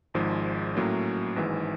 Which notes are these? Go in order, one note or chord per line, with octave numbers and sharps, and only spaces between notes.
G#1 G#2 F3 G#3
A2 F#3 A#3 C#4
G#1 G#2 E3